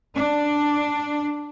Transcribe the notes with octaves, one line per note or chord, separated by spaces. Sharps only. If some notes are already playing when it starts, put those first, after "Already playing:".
D4